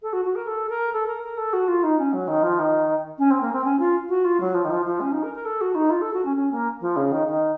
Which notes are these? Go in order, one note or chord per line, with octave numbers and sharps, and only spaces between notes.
A4
F#4
F#4
A#4
A4
A#4
A4
A#4
A#4
A4
F#4
F4
D#4
C#4
F#3
D#3
F3
D#3
C#4
C4
A#3
C4
C#4
F4
F#4
F4
F#3
F3
D#3
F3
F3
C#4
D#4
A#4
A#4
A4
F#4
D#4
F4
A4
F#4
C#4
C#4
A#3
F3
C#3
D#3
D#3